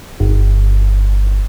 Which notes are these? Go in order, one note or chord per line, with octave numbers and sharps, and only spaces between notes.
G1